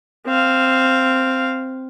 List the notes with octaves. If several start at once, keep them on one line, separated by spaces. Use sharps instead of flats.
C4 F5